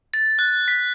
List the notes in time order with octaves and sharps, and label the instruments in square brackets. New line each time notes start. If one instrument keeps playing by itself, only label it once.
[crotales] A6
F#6
B6